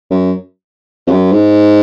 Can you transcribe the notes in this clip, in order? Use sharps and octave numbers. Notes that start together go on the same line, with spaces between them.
F#2
F2
F#2
G#2